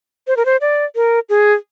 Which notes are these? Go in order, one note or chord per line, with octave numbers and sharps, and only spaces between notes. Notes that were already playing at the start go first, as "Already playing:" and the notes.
C5
A#4
C5
D5
A#4
G#4